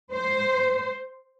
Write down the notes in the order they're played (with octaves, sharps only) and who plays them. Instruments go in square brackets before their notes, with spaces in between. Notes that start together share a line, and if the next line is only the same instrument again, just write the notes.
[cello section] C5